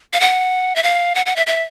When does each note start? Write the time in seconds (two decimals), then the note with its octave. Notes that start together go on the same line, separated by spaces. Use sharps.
0.13 F5
0.20 F#5
0.76 E5
0.83 F5
1.15 F#5
1.26 F#5
1.36 E5
1.47 E5